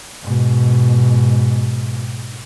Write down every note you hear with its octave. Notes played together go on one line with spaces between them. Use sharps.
G#2 B2